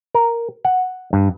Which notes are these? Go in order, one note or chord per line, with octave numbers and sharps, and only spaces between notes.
A#4
F#5
G2